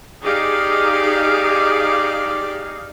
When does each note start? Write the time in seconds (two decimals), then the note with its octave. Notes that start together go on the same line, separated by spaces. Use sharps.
0.23 D#4 G4 G#4 D5 F5